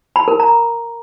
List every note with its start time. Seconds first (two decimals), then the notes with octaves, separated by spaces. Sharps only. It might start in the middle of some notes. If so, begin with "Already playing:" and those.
0.16 B5
0.28 A#4
0.40 A#5